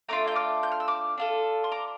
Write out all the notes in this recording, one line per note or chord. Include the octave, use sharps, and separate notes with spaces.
A3 D4 F4 A#5 D6
G6
D6 F6
G6
F6
E6
D6 F6
D4 F4 A4
C6
A#5 D6